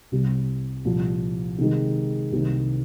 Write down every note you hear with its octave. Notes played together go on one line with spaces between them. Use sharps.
C2 C3 G3
C2 A#2 F3
C3 D#3 G#3
C2 C3 D#3 A#3